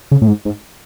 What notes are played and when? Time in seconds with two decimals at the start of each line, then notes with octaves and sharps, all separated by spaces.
0.11 C#3
0.22 A2
0.27 G#2
0.45 G#2